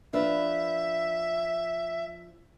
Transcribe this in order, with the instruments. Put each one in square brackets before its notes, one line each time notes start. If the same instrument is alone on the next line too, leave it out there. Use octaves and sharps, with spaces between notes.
[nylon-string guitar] F3 D4 B4 [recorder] E5